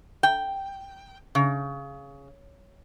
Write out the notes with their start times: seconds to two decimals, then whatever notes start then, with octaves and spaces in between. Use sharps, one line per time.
0.23 G5
1.35 C#3